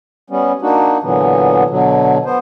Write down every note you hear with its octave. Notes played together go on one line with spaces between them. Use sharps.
G3 B3 C#4
A#3 D4 D#4 F#4
A#2 D3 E3 F#3 B3
B2 D3 F#3
B3 C5